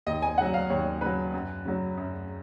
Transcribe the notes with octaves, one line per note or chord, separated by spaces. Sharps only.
D#2 D#5
G#5
C#3 F#3 F#5
F5
D#2 C#5
C#3 F#3 B4
F#2
C#3 F#3
F#2